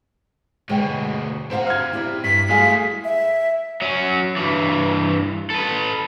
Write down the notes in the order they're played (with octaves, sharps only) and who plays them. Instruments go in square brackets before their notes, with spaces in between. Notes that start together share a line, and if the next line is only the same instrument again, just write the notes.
[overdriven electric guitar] D2 B2 [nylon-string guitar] G#3 C#5 G5
[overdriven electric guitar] C4 A#5 [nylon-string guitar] C5 F5 F#5
[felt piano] F6 G#6
[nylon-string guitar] E4 G4 D5
[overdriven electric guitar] G2 [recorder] B6
[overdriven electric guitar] G#3 A3 [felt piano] G#4 F5 G#5
[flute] E5
[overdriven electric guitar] F#3 C#4
G2 E3
A4 B4